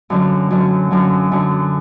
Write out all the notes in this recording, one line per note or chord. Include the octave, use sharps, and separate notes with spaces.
F#2 D3 F#3
F#2 D3 F#3
F#2 D3 F#3
F#2 D3 F#3